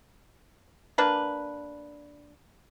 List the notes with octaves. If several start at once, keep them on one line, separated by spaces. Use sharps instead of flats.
A#3 D4 B4